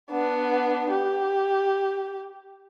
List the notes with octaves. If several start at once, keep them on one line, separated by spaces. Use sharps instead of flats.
B3 D4
G4